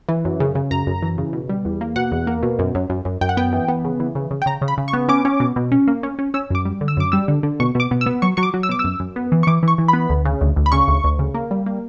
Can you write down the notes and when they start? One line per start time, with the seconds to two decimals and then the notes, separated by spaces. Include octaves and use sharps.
0.09 E3
0.25 F#2
0.40 C#3
0.55 C#3
0.71 F#2 A#5
0.87 F#2
1.02 E3
1.18 C#3
1.33 B2
1.49 G3
1.65 E2
1.81 A#3
1.96 B2 F#5
2.12 E2
2.27 A#3
2.43 B2
2.59 F#2
2.75 F#2
2.90 F#2
3.05 F#2
3.21 F#2 G5
3.29 F#5
3.37 B3 G5
3.53 E3
3.68 B3
3.85 C#3
4.00 E3
4.15 C#3
4.31 C#3
4.42 G5
4.46 C#3 A#5
4.62 C#3
4.68 B5
4.78 C#3
4.88 C#6
4.93 B3
5.08 C#4 D6
5.25 C#4
5.40 B2
5.56 B2
5.72 C#4
5.88 A#3
6.03 C#4
6.19 C#4
6.34 C#4 E6
6.50 F#2 D6
6.65 G3
6.81 D3
6.88 E6
6.97 F#2 D6
7.12 G3 E6
7.28 D3
7.43 D3
7.60 B2 C#6
7.75 B2 D6
7.91 B2
8.01 E6
8.06 B3
8.22 F#3 C#6
8.37 F#3 C#6
8.43 D6
8.54 F#3
8.63 E6
8.69 B2 D6
8.79 E6
8.84 F#2
9.00 F#2
9.16 B3
9.32 E3
9.43 C#6
9.47 E3 D6
9.63 E3 C#6
9.78 E3
9.88 B3 B5
10.09 D2
10.25 C#3
10.41 D2
10.56 D2
10.66 B5
10.72 C#3 C#6
10.88 D2
11.04 D2
11.19 C#3
11.35 A#3
11.51 G3
11.66 A#3